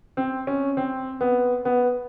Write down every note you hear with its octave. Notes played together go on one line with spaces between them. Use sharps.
C4
C#4
C4
B3
B3